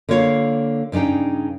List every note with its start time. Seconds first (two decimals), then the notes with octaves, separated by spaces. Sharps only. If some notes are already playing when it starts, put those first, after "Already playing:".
0.09 D3 A#3 F4 C#5 F5
0.92 G2 C#3 D4 D#4 G5